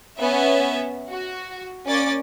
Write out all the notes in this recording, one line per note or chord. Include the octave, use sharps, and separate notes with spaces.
B3 C#4 E5
F#4
A#3 C#4 D5 A6